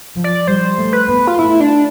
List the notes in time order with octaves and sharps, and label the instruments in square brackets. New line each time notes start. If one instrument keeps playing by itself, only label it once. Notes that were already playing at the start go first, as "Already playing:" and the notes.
[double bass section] F3
[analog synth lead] D5
[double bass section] G3 [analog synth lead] C5
[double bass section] A3
[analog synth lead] B4
[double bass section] B3
[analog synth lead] F4
[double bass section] A3 [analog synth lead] E4
[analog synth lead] D4